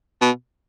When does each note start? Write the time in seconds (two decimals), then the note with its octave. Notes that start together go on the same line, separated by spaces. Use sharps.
0.22 B2